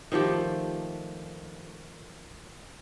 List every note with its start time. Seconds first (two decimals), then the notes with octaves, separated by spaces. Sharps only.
0.12 D#3 F3 A3 G4